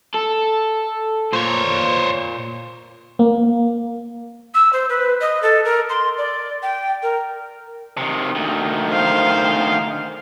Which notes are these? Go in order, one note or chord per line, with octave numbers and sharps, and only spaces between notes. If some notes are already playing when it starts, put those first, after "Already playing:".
A4
A#2 C5 C#5
A#3
E6
C5
B4
D#5
A4
A#4
C6
D5
G5
A#4
C3 D#3
D2 D#3
C5 F5